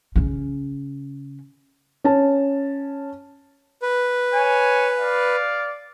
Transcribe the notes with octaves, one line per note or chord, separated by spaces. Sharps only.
C#3 C#4
C#4 A5
B4
C#5 G#5
D5 F5